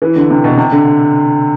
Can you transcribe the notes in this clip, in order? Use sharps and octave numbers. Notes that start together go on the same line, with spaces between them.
E3
D3
C3
B2
C3
D3